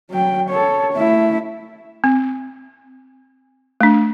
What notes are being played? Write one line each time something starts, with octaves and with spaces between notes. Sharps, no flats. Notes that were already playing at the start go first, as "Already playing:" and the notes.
F#3 G5
A4 C#5
A3 E4
C4
A3 D4